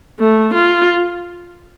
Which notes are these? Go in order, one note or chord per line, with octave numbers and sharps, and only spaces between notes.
A3
F4